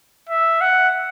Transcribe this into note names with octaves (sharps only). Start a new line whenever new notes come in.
E5
F#5